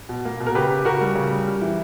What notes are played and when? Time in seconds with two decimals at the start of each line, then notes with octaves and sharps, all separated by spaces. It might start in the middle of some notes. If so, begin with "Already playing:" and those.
0.09 B2
0.25 A#3
0.40 B2
0.47 A#4
0.55 C#3 G4 B4
0.71 C#3
0.85 C#3 F#4 A#4
1.01 G3
1.16 C#3
1.31 G3
1.46 G3
1.61 E3